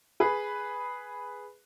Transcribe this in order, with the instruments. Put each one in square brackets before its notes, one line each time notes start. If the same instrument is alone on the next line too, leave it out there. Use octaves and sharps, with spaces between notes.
[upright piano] G#4 B4